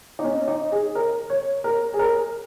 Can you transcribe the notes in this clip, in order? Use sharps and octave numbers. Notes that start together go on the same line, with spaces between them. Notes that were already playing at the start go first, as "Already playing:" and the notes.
D#4
C#4
D#4
G#4
A#4
C#5
A#4
G#4
A#4